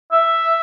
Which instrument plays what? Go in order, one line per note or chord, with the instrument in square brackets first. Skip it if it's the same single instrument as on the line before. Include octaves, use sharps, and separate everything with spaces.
[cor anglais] E5